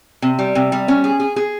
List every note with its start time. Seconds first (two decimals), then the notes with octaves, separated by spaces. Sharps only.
0.22 C3
0.39 G3
0.55 C3
0.72 G3
0.88 C#4
1.04 G#4
1.20 G#4
1.36 G#4